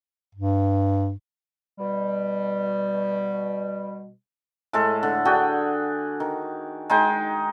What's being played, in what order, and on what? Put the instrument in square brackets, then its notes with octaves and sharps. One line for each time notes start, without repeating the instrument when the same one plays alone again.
[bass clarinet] G2
[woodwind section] B2 G3
[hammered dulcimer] A2 G#3 A4
D3
D4 F#4 G#4 G5
D#3
G#3 D#4 G5